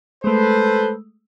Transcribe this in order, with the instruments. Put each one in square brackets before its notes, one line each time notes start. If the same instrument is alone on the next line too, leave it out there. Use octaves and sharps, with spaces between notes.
[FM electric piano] G#3 A3 [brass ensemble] A4 B4 C5